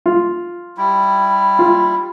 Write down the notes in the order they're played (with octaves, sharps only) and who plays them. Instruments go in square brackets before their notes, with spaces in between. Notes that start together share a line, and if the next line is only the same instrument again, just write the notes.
[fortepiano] F4
[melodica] G3 E4
[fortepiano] F4